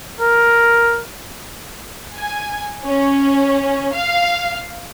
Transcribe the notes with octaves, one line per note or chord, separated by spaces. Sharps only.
A#4
G#5
C#4
F5